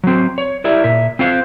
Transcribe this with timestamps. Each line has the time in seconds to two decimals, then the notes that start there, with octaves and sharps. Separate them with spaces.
0.04 F#3 C4
0.38 C#5
0.64 E4 G4 A#4 D5 E5
0.84 A#2 E5
1.19 C4 F4 C5 F5